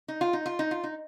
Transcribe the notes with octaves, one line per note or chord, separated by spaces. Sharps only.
D#4
F4
D#4
F4
D#4
F4
D#4